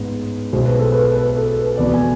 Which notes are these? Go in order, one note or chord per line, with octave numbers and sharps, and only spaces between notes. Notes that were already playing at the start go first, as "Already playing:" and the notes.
Already playing: A1 G#2 G#3 B3
B1 B2 G#3 C5
B4
A4
B4
B4
A4
B4
F1 E2 B2 B3 D5
G#5